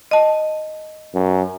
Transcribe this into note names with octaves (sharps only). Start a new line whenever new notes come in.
D#5 A5
F#2